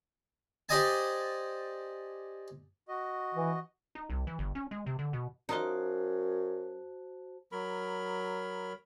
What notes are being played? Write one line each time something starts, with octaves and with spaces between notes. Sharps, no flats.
G4 C5 D5 D#5 G#5 A5
F#4 D#5
E3
D#4
C2
E3
G1
C#4
G#3
C3
D3
B2
F#2 D#4 F4 F#4 C5 D#5 A5
F#3 A#4 B5